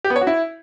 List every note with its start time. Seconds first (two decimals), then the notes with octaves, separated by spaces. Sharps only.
0.04 G4
0.10 B3
0.16 C#5
0.21 F#4
0.27 E4